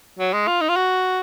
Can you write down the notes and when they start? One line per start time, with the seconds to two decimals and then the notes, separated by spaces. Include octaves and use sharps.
0.19 F#3
0.33 G#3
0.47 F4
0.61 D#4
0.69 F4
0.76 F#4